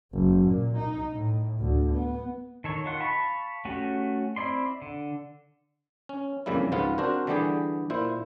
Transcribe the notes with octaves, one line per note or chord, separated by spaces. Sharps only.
F#1
A#2
D#4
A2
D2
B3
D#3 A4 C#5
D#3 F4 F#5
F5 A5 B5 C#6
A3 C#4 F#4 G4
C4 E4 D5 C6
D3
C#4
B1 F2 C#3 G3 A#3 E4
C#2 G#2 F3 B3 F4
C4 D4 F#4 A#4 C5
D3 E3 G3 B3 G4 G#4
A#2 E4 C5